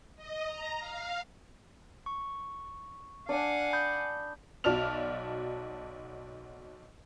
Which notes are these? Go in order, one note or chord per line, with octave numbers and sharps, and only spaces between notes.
D#5
A#5
F5
C#6
D4 F5 F#5 G#5
B5 D#6 G6
B1 F#4 D5 A5 F6 F7